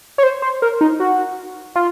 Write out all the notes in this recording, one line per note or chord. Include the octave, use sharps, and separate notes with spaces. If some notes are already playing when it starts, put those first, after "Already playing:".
C#5
C5
C5
A#4
D#4
F#4
F4